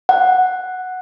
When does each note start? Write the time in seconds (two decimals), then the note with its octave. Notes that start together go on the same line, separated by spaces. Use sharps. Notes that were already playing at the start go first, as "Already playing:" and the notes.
0.09 F#5